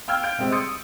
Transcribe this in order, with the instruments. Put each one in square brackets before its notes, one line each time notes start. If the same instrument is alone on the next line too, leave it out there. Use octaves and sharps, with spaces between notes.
[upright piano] F5 G5 E6 F6 G#6
F5 G6 D7
C3 G3 G#3 C4 G4
C6 D#6 G6 A6 C#7
D#6